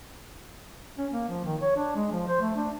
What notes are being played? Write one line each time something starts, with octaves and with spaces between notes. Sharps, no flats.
C#4
A#3
F3
D#3
C#5
D4
G#3
F3
C5
A3
D4